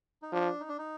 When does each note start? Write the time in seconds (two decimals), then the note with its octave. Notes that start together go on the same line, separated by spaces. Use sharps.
0.22 D#4
0.32 F3 D4
0.60 D#4
0.69 D4
0.78 D#4